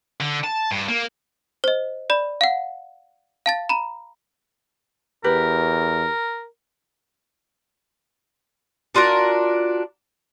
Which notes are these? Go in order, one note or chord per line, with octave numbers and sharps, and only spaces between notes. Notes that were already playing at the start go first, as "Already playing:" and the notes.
D3
A5
G2
A#3
C5 D#5
D5 B5
F5 F#5
F5 A5 A6
A#5 B5
E2 G4 A#4 B4
D4 F4 F#4 A#4